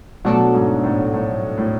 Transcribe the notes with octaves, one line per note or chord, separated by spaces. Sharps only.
B2 F#3 A3 D4 F#4 A4
G#2
A2
A2
A2